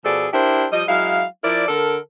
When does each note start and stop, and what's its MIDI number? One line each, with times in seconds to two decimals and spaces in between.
0.05 0.28 47
0.05 0.28 53
0.05 0.28 68
0.05 0.28 69
0.05 0.28 74
0.33 0.67 62
0.33 0.67 64
0.33 0.67 67
0.33 0.67 70
0.33 0.67 72
0.72 0.83 53
0.72 0.83 55
0.72 0.83 75
0.88 1.24 54
0.88 1.24 56
0.88 1.24 64
0.88 1.24 77
1.44 1.67 53
1.44 1.67 64
1.44 1.67 70
1.44 1.67 74
1.68 1.98 50
1.68 1.98 69
1.68 1.98 70